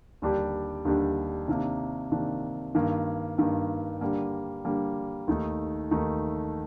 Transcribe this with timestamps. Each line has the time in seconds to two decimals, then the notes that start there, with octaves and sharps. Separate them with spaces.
0.22 D#2 D3 G3 D4 G4
0.85 D#2 D3 G3 D4 G4
1.48 C3 D#3 A#3 D4
2.12 C3 D#3 A#3 D4
2.75 G2 D#3 A#3
3.38 G2 D#3 A#3
4.01 D3 G3 A#3
4.65 D3 G3 A#3
5.28 D#2 D#3 A3 D#4
5.91 D#2 D#3 A3 D#4